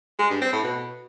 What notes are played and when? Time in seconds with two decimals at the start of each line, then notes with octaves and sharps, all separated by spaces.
0.19 G#3
0.30 G2
0.41 C4
0.52 A2
0.64 B2